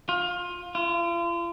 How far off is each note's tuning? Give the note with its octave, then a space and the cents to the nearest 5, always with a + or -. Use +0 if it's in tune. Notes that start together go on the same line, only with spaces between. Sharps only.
F4 +20
F4 -40